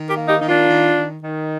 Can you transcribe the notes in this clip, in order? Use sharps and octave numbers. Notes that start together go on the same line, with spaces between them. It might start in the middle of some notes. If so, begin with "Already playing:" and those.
Already playing: D#3
G4 A#4
A#3
D#4 G4
D#3 D#4
D4 F4
D#3
D#3
D#3